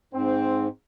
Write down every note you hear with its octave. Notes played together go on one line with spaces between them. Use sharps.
G#2 C4